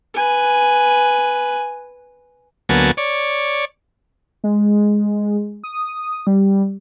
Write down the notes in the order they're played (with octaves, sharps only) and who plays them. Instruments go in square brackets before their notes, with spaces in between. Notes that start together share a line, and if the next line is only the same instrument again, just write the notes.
[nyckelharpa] B4 G#5
[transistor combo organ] D2 F#3 A#3 B3 G#5 A5
C#5 D5
[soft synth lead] G#3
D#6
G3